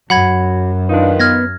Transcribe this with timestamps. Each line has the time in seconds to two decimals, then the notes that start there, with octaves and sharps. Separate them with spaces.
0.10 F#2 F#3 F#5 B5 G#6
0.89 D#3 D4 D#4 F4 B4
1.20 B3 F6 G#6 A#6